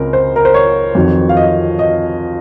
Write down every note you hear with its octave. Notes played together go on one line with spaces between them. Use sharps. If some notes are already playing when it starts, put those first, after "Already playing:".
Already playing: C#2 C#3 C4 A#4
C5
A#4
C5
C#5
F2 D#3 F#3 C4
F5
D#5
D#5